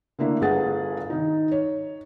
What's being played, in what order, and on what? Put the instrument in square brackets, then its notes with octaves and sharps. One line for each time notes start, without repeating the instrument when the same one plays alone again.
[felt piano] D3 A3 A#3 D4 E4
G1 G2 G#4 B4 F#5 A6
D#3 D#4
C#5